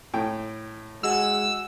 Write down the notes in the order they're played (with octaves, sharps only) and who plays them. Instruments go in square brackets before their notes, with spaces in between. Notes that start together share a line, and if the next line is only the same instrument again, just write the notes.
[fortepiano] A2 G5
[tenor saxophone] G#3 [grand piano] F#4 F#5 G#5 [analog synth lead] E6